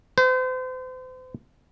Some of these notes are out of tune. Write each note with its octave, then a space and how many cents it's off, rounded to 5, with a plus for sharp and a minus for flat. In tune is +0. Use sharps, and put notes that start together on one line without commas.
C5 -40